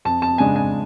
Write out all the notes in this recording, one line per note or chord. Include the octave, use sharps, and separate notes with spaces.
F2 A5
A5
C#3 G#3 D4 G#5
G#5